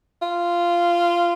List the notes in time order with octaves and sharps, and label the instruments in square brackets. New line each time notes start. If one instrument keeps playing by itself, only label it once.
[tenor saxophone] F4